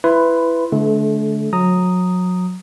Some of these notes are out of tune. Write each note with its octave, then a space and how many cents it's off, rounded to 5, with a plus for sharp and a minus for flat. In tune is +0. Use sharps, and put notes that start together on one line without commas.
E4 +15 B4 +10 C6 +0
D3 -20 A3 -40
F#3 -30 A#5 -10 D#6 +0